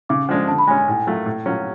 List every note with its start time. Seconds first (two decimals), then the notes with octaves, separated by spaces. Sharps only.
0.09 C#3 D6
0.29 F3 G#3 D4
0.48 D3 A5
0.58 B5
0.67 G#3 G#5
0.70 C#4
0.78 G#5
0.88 A2
1.07 F#3 A3 F4
1.26 A2
1.46 F#3 C#4 F4